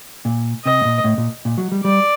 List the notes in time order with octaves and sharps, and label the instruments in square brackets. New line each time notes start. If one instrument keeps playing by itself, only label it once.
[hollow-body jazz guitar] A#2
[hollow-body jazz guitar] C3 [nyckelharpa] D#5
[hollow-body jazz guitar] A2
A#2
A2
A#2
A#2
F#3
G3
[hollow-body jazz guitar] G3 [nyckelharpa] D5